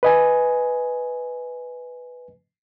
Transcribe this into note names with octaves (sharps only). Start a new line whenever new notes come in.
B4 D#5 G#5